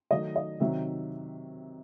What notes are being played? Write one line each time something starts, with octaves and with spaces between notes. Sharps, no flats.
D#3 F#3 A3 D#5
D#5
C3 D#3 F#3 E5